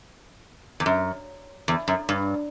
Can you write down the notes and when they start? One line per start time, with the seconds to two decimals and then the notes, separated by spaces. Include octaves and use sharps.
0.80 E2
0.86 F#2
1.68 E2
1.88 F#2
2.09 G2